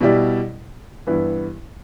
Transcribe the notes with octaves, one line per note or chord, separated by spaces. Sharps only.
B2 G3 E4 G4 D5
G2 E3 B3 E4 B4